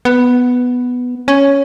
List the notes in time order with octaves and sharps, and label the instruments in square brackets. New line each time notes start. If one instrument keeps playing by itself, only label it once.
[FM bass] B3
C#4